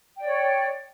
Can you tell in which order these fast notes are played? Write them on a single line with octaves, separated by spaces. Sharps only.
G5 D5 C#5